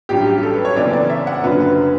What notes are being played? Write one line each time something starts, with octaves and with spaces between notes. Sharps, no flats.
A1 G2 F#3 C#4 G4
G4
A4
B4
C#5
F#1 F#2 E3 B3 D5
D5
E5
F#5
F#1 F#2 D3 F#3 C#4 B4
B4